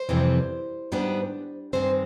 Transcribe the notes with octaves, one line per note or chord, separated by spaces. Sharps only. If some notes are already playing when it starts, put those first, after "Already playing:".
Already playing: C5
F2 C3 E3 G3 C4
G#2 D#3 G3 B3 D4
G2 D#3 G#3 C4 C5